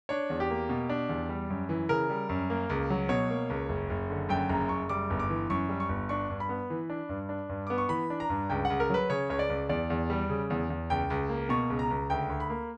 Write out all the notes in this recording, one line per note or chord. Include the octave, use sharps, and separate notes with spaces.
D4 C#5
E2
G4
A#3
B2
D4
E2
G3
F#2
E3
C#3 A#4
G3
F#2
A#3
C#2
F#3
B2 C#5
A#3
C#2
F#1
F#1
D3
F#2 G5
F#1 A#5
F#1 C#6
G3 D6
G1
D6
E3
F#2 C#6
G3
C#6
G1
D4 C#6
G2
B5
B3
E3
D4
G2
D4
G2
B3 D6
C#6
E3 B5
D4
A#5
G2
C#2 G5
F#5
C#2
A#4
F#3 B4
C#3 C#5
C#2 C#5
D5
C#2
E2 D5
E2
G3
C#3
E2
E2
C#2 G5
C#2
A#3
B2 C#6
C#2
A#5
C#2
D2 G5
D2
B5
A#3